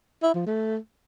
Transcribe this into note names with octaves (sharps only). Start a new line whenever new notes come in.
E4
F3
A3